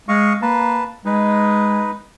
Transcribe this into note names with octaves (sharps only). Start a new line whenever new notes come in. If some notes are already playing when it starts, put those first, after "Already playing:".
G#3 D#5 F5 C#6
A#3 B4 A5
G#3 D#4 B4